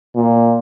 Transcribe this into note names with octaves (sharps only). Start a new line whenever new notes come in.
A#2